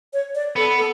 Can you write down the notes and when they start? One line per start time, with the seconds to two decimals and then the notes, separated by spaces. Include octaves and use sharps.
0.13 C#5
0.35 D5
0.56 B3 A4
0.78 A4